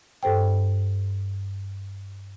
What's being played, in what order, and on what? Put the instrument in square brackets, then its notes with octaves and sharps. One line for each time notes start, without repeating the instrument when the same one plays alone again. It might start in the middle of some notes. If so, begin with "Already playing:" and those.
[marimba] G2 A4 C5 G5